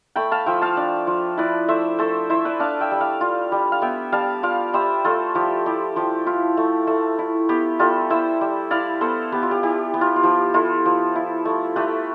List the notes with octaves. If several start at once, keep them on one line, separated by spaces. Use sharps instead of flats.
A3 G5 B5
F5 A5
F3 E5 G5
F5 A5
D4
F3
E4 B4 D5
A3 C5 E5
A3 A4 C5
E4 C5 E5
B4 D5
D4 F5 A5
E5 G5
G3
D5 F5
F4
G3
F5
B3 E5 G5
G3 F5 A5
F4 D5 F5
G3 C5 E5
A3 F4 A4
F3 G4
E4 G4
F3 G4
E4 F4
A3
A3
E4
B3 G4
G3 F4 A4
E4 C5 E5
G3
E4 D5 F5
B3 A4 C5
B3 G4
F4
G4
E4 G4
B3 G4
F4
F4
F3 G4
E4 F4 A4
F3
E4
A3
A3 G4 B4